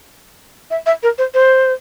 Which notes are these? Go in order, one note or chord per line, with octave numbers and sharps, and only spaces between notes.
E5
E5
A#4
C5
C5